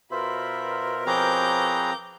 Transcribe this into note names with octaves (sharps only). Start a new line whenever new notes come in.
B2 F4 A#4 C5 E5 B5
F3 C4 G#4 B4 C#5 A#5 D6 G6